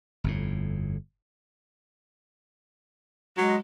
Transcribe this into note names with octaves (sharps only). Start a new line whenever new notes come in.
G1 F2 A2
F#3 G#3